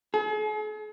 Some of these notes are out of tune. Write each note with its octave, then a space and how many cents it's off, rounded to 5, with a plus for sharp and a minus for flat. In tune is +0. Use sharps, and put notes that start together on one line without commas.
G#4 +45